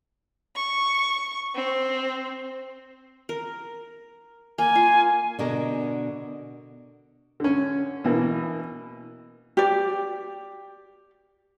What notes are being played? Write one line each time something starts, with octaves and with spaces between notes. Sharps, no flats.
C#6
C4
A#4
A#3 G#5
F4
B2 D3 A#4
D3 C#4
B2 E3 A#3
G4 D5